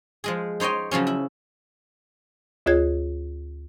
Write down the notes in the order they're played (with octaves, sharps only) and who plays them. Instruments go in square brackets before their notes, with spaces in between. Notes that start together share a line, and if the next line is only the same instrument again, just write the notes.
[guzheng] F3 G#3 G#4
D#4 C5 C#5 D#5 G5
C#3 F3 F#3 C#4
E4
[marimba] D2 F4 G#4 C#5 G#6